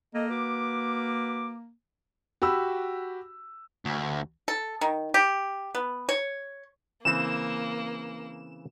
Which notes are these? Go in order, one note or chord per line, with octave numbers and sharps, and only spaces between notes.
A#3 A4 D#5
F#4 B4 D6
F#4 G4 B5 E6
D2
A4
D#3
G4
B3
C#5
C#3 E3 A#3 C4 E7